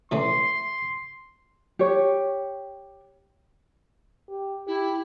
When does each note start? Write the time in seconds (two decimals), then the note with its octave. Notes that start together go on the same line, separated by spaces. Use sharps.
0.12 E3 A3 C#4 C6
1.79 G4 C#5
4.29 G4
4.67 E4 G4